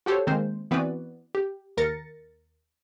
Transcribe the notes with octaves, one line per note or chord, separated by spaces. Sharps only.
F#4 G4 A4 C5 C#5
D#3 G#3 A#3 C4 C5
E3 B3 C4 F#4 B4 D5
G4
D#2 A#4 A6 A#6 C#7